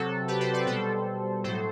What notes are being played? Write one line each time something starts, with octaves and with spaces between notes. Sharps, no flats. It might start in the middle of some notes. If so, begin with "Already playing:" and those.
Already playing: C3 F#3 F#4 A4
G4 B4
A4 C5
B4 D5
B2 G3 A4 C5
A2 F#3 A4 C5